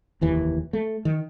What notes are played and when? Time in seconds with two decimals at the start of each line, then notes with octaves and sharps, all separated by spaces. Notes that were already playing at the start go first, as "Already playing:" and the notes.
0.21 F1 D#2 E3
0.73 A3
1.05 D#3